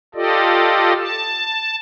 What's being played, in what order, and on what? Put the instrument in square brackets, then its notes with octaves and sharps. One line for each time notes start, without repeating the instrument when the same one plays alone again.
[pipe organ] F4 G4 A4 D5 D#5
A5